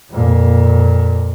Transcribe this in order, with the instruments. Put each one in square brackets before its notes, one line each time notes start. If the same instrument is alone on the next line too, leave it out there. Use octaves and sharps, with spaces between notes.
[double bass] F2 A#2